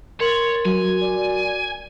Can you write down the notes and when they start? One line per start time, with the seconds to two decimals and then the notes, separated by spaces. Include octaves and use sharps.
0.20 A#4 C#5 C6 A6 F#7
0.65 F#3 F#4 G#5
1.01 D5